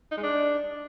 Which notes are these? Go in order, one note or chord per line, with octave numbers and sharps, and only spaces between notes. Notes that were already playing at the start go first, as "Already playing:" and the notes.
D#4
G#3
D4